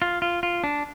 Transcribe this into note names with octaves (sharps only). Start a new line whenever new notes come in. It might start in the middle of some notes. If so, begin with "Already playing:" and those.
F4
F4
F4
D4